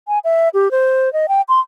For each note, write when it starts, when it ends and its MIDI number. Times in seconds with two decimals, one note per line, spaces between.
0.08 0.19 80
0.24 0.49 76
0.54 0.71 67
0.71 1.12 72
1.13 1.26 75
1.29 1.42 79
1.49 1.60 84